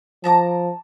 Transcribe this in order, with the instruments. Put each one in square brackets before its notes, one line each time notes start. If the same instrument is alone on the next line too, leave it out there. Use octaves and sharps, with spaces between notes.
[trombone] F3 [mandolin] A5 A#5 D6